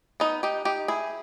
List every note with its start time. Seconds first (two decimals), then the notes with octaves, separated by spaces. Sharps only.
0.20 B3 D#4
0.43 D#4 G4
0.65 D#4 G4
0.88 E4 G#4